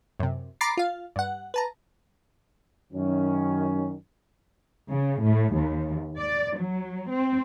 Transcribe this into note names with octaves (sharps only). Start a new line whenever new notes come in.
F#2 C3
A#5 B5 D6 A6 C7
F4 F5
G2 F#5
B4 A5 A#5
F#2 D#3 C#4
C#3
A2
D#2
D5
F#3
C4